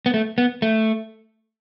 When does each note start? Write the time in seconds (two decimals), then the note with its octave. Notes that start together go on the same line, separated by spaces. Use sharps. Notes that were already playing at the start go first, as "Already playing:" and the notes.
0.06 B3
0.14 A3
0.38 B3
0.62 A3